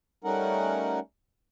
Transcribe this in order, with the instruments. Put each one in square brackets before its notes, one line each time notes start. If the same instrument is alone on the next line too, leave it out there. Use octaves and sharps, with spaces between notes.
[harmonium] G3 A3 C#4 D#4 A#4 F#5